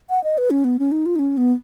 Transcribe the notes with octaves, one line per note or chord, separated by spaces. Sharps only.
F#5
D#5
B4
C#4
B3
C#4
D#4
F4
D#4
C#4
B3